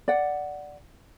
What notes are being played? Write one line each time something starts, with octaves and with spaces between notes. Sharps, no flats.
D5 F#5